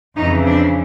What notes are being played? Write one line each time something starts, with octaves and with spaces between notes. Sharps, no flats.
F2 C#3 E3 C#4 D#4
C4 D4